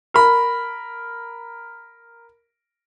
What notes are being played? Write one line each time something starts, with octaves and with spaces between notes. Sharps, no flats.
A#4 B5